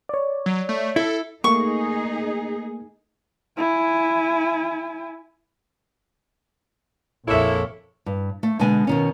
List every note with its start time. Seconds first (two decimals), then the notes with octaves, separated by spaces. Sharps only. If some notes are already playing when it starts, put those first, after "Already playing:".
0.09 C#5 D5
0.46 F#3
0.69 A3
0.96 E4 A4
1.44 A3 A#3 D#4 G#4 C#6
3.58 E4 G#5
7.28 A#1 F2 G#3 A#3 E4 A4 C#5 E5
8.06 G2
8.43 A3
8.59 B2 D3 G#3 G#5
8.87 B2 D#3 C#4